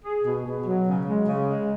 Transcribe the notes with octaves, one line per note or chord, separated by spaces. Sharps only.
G#4
B2
B2
F#3
C#3
G#3
C#3
G#3